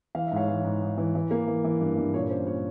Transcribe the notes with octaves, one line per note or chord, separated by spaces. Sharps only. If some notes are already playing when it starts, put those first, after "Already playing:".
E3 F5
E5
G#2 C#5 F5
E3
G#2
G#2
E3
E3
A#3
E3
E3
G2
G2
A#2 C#5
C#4 C5
A#2 C#5